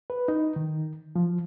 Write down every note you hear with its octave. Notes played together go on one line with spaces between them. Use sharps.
B4
D#4
D#3
F3